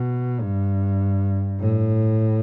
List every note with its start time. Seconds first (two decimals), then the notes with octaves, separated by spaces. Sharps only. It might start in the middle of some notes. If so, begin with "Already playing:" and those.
Already playing: B2
0.41 G2
1.60 A2